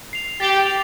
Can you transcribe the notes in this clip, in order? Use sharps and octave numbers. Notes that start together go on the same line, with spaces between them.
C7 F7
G4 A6
F7